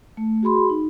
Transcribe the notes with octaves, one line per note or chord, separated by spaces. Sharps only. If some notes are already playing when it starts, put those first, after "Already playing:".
A3
F#4 G#4 B5 C6
D#4